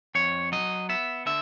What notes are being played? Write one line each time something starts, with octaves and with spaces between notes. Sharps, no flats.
F2 C#5
F#3 D#5
B3 E5
D3 E5